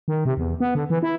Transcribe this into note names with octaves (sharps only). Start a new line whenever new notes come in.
D#3
C3
E2
B3
D3
E3
E4